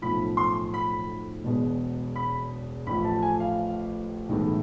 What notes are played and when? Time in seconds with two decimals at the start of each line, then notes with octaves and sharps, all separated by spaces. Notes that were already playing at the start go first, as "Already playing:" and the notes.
0.02 B1 A2 F3 B5
0.37 C6
0.74 B5
1.44 E1 E2 B2 G#3
2.16 B5
2.86 A1 A2 F3 A3 B5
3.04 A5
3.22 G#5
3.40 F5
4.29 B1 A2 E3 G#3